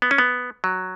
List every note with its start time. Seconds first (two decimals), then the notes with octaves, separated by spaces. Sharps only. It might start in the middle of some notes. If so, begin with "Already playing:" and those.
0.02 B3
0.11 C#4
0.18 B3
0.64 F#3